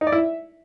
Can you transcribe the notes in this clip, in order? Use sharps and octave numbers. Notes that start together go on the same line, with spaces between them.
D#4
D5
E4
E5